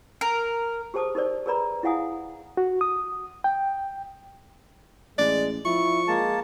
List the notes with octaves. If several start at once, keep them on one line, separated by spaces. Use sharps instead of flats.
A#4
G4 G#4 C5 A5 D6 D#6
D#4 G4 A#4 C5 D5
G#4 A#4 B4 D5 A#5 B5
E4 G#4 F5 F#5 G#5 D#6
F#4
D#6
G5
A1 G#3 D5
F3 E4 C#6
G#3 A#3 A5